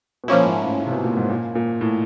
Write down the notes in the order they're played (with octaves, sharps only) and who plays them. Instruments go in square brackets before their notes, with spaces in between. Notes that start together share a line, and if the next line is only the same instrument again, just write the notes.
[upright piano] B2
[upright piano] A#2 [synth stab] F3 A#3 C#4 E4
[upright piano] G#2
A2
A2
C3
B2
A#2
G#2
A#2
A#2
A2